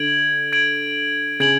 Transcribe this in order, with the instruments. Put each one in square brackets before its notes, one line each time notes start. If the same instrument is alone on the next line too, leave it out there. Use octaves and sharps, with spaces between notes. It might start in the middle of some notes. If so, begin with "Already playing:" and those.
Already playing: [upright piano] D3 [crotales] G#6 D7 F#7
[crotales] G#6 D7 F#7
[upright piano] C#3 [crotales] G#6 D7 F#7